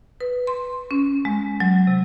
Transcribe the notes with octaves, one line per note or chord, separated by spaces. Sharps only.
B4
C6
C#4
G#3
F#3
C3